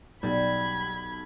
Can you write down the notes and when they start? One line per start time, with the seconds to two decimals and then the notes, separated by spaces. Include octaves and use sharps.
0.23 B1 G3 B5 G#6